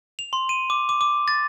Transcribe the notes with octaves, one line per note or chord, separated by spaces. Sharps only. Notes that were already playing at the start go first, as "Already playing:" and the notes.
F7
C6
D#7
D6
D6
D6
A6